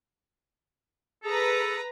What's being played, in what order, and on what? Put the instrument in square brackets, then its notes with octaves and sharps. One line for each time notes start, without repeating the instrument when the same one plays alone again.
[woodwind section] G#4 A4 [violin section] B4 A#5